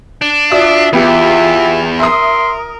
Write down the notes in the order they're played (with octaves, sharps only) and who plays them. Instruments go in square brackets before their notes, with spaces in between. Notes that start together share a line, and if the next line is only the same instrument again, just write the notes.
[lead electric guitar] D4
[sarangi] F4 [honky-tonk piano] F#4 D5 D#6 [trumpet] E5
[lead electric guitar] E2 [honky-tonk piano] B3 G4 [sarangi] F4 [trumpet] E5
[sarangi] A#4 [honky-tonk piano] E5 D#6 [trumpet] C6